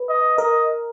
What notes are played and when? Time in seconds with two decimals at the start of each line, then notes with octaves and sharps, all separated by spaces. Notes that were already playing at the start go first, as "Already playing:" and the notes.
Already playing: B4
0.09 D#5
0.38 A#4 D#5